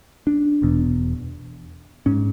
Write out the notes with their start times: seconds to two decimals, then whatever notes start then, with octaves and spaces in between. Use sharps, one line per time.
0.27 D4
0.62 E1 E2 B2
2.06 G#2 C#4